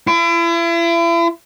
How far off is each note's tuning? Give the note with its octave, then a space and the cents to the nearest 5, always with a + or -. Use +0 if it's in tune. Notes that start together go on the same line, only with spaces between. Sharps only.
E4 +40